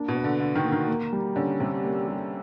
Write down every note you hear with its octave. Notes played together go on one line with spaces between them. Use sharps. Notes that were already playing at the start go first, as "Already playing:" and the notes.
Already playing: A#3 D4
B2
B4
D3
D3 F#4
D#3
A#3
D#3
A#3
G3
D3 C#4
C3 G3
A#3
G3